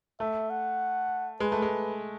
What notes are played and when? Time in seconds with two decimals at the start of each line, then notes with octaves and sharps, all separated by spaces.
0.20 A3 E5
0.50 F#5
1.40 G#3 B4
1.52 A3
1.62 G#3